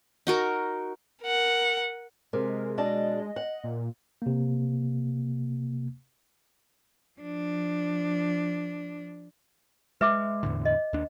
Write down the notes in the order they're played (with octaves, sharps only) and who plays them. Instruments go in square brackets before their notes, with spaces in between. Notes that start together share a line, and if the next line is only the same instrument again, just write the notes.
[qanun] D#4 F#4 A#4
[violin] A#4 F#5
[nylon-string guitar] C3 [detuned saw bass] G#3 [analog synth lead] A#4
[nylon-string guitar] B2 D4 A5 [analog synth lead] D#5
[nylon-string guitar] F#5
[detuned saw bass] A#2
[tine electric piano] C3 A#3
[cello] F3 D4
[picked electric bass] G#3 [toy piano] B4 E5 D6
[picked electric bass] E2 A2 D3
[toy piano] D#5
[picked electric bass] D#2 D4